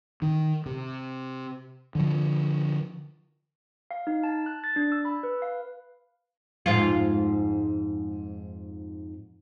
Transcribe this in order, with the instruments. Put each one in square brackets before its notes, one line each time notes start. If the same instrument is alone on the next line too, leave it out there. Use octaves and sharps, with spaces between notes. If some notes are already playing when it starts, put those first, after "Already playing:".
[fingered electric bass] D#3
C3
D3 F3
[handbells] F5
D#4
A5
F#6
A6
D4
E6
B5
B4
F5
[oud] F2 G#2 F4